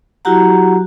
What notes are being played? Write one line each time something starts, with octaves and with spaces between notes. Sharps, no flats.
F#3 E4 F#4 G4 F#5 A#5